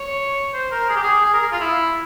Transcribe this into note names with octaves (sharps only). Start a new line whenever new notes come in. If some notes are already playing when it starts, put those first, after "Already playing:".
Already playing: C#5
C5
A#4
G#4
G4
G#4
G#4
A#4
G#4
F4
E4